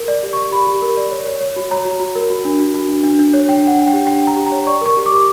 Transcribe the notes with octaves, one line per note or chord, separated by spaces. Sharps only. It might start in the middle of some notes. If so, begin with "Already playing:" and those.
Already playing: A#4
D5
G4
C#6
D5
G4 B5
G4
A#4
D5
C#5
C#5
C#5
F#4
C#5 A#5
F#4
F#4
A#4
F#4
D4
F#4
F#4
D4
D4
D4
C#5
D4 G5
D4 F#5
D4
G5
G4
D4 G5
D4 A#5
G4
A#5
C#5
D5 C#6
A#4 C#6
G4
D6
G4